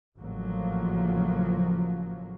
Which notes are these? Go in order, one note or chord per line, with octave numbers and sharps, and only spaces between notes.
A1 C#3 F3 F#3 A#3